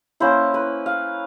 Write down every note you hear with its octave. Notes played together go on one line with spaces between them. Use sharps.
A#3 C#4 E4 C5
B4
F5